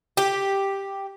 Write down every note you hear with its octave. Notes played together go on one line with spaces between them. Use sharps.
G4